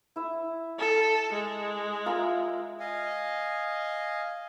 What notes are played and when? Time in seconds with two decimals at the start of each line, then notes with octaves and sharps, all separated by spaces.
0.16 E4 E5
0.78 A4
1.33 G#3
2.06 F4 A#4 E5
2.80 D#5 F5 G#5